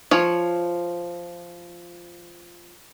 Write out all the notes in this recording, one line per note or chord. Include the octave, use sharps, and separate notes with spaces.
F3 C#5